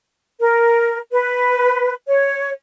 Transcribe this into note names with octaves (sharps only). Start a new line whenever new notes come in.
A#4
B4
C#5